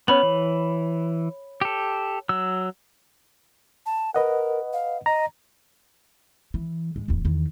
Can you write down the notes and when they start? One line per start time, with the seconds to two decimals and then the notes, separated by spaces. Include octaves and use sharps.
0.08 B3 C#4 C#5 B5 F#7
0.23 E3
1.61 G4 A4
2.29 F#3 E6
3.86 A5
4.14 A#4 B4 D#5 F#5
4.73 F5
5.06 D#5 A#5
6.54 E3
6.96 G2 G#3
7.08 D1 E2
7.25 E2 D#3